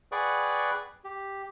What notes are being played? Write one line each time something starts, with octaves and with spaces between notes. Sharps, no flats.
G#4 B4 D5 F#5 G5 C#6
G4